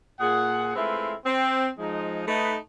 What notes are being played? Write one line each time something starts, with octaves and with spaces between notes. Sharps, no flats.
A#2 G#4 F#5
G#3 A3 C4 E4 F4 B4
C4
F3 G#3 D#4
A3 D#4 B4